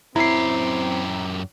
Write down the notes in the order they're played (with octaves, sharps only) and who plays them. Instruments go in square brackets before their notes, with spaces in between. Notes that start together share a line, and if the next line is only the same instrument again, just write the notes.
[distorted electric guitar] F#2 G4 [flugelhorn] C4 [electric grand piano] E4 [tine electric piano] A#5 C7